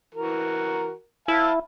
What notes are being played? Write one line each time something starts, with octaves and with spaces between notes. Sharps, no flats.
E3 F#4 A#4
E4 F5 A5